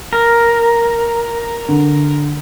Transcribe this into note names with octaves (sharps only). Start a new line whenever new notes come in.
A#4
D3